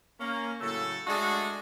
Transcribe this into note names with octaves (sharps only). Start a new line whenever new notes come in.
A#3 C#4
A2 C#3 F#3 A3 A4
G#3 A3 D4 F#4 G#4 A4